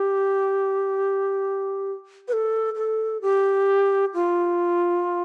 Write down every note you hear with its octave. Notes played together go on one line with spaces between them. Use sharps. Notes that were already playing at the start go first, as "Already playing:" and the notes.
Already playing: G4
B4
A4
A4
G4
F4